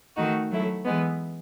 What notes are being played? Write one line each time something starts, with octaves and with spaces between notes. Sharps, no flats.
D#3 A3 D#4 F#4
F#3 A3 E4
E3 G#3 B3